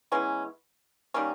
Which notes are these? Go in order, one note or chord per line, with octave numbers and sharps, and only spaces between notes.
E3 G#3 B3 C#4
D#3 G3 A#3 C#4